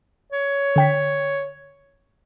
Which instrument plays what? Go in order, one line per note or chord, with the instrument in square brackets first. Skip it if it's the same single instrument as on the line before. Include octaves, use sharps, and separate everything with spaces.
[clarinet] C#5
[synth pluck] D3 G5 B6